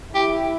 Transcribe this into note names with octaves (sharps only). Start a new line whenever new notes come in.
E4 G4